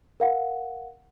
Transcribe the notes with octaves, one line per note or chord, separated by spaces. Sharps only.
A#4 F5 F#5